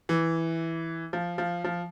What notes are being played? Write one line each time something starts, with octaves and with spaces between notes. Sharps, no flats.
E3
F3
F3
F3